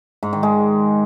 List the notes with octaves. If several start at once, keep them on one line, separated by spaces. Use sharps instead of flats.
G#2
D#3
G#3